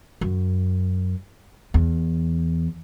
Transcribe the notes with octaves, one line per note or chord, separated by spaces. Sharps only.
F#2
E2